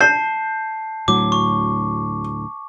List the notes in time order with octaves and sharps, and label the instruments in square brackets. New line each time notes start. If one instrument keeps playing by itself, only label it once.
[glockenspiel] A5 C7 [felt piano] G6
[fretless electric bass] D2 A2 F#3 [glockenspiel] D6
[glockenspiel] C#6